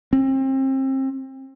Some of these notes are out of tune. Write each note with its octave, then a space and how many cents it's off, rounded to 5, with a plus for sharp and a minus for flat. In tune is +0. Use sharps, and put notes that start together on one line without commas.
C4 +30